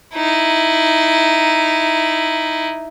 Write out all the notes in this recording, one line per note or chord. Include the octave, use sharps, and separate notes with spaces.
D#4 E4